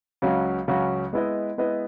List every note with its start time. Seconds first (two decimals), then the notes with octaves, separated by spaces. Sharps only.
0.22 C#2 C#3 F#3 C#4 F#4
0.68 C#2 C#3 F#3 C#4 F#4
1.13 G#3 B3 E4 B4 D#5
1.58 G#3 B3 E4 B4 D#5